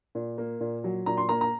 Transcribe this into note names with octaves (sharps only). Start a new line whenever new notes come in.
A#2
A#3
A#2
F#3
A#2 A#5
C6
A#3 A#5
A#5